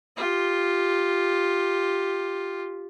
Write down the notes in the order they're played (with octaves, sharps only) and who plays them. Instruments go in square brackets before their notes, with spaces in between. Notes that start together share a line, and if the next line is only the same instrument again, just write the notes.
[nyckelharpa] F4 G4